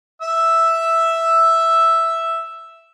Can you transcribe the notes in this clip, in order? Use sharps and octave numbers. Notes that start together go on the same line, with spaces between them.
E5 E6